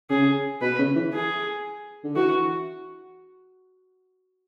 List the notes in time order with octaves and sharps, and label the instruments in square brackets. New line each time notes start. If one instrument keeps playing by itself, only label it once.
[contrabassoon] C#3 [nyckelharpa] G#4
[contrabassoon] B2 [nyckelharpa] B4
[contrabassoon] C#3
E3
[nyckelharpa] G#4
[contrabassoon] D3
[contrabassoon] E3 [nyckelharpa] F#4